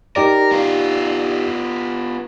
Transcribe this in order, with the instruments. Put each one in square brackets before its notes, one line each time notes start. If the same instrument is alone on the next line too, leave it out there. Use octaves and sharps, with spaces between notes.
[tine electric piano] D#4 G4 D5 [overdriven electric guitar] A#4
[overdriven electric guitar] B3 F4